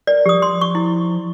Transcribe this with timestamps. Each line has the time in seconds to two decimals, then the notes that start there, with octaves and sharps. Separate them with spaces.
0.07 A#4 D5
0.26 F3 G4 D#6
0.42 C6
0.61 C#6
0.75 E4